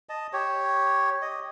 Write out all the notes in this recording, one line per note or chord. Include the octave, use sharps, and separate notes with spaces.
D#5 A5
G4 C#5
D#5